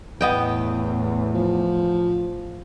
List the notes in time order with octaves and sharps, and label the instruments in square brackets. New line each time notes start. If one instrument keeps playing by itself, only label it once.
[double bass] E2 A2 [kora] B3 D#5 G5
[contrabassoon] F3